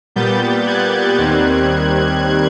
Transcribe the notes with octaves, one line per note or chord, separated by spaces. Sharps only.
A#2 G3 B3 G6 A6
F#6 G#6
D#2 D#3 G3 C4